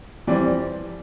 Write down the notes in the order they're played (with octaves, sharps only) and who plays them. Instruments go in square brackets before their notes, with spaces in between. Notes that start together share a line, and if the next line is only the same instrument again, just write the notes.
[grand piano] F2 E3 G3 C4 D5